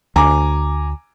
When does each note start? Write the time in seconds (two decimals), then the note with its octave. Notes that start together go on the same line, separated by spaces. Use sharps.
0.16 D2 G#5 A#5 D6